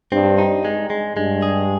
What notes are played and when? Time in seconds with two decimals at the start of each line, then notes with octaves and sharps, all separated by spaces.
0.12 G2 C4
0.38 D#4
0.65 G#3
0.90 G#3
1.16 G2 G#3
1.42 G#4